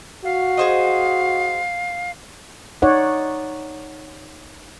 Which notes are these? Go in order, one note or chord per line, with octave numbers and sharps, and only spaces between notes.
F#4 F5
G#4 C5 D#5
D#4 C#5 D5 F#5